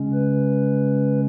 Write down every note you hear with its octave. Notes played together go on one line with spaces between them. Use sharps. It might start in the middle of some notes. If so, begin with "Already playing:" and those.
Already playing: C#3 G#3 C#4
B4